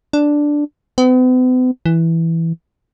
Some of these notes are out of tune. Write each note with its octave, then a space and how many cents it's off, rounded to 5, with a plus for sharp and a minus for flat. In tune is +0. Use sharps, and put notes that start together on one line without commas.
D4 +0
B3 +45
E3 +0